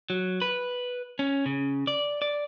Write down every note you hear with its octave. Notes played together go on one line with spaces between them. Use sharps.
F#3
B4
C#4
C#3
D5
D5